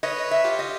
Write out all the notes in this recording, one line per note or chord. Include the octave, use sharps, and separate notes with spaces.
B4 C#5 D#5
E5
F4 G4
D#5